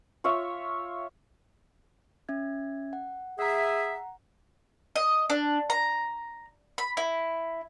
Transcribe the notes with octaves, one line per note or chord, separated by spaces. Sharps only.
F4 C#5 E5
C#4 E5 G#6
F#5
G#4 E5 F#5 A#5
D#5
D4
A#5
B5
E4